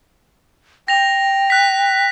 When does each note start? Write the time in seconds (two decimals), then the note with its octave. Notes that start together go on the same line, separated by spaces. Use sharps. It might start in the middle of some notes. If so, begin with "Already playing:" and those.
0.88 G5 A#6 F7
1.50 F#6 B6